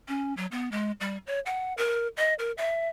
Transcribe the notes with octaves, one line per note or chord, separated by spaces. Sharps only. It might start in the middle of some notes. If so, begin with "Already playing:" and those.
C#4
F#3
B3
G#3
G3
C#5
F#5
A#4
D#5
A#4
E5